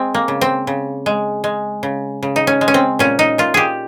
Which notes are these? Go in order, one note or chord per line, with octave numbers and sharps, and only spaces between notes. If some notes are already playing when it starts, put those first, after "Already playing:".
Already playing: G#3 C4
A#3
C#3
C4
C#3
G#3
G#3
C#3
C#3
D#4
C#4
G#3
C#4
C4
A#2 C#4
D#4
A#2 F4
G4 G#4